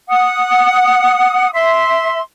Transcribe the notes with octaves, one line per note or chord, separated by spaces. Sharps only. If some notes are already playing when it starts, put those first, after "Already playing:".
F#5 D#6
E5 C6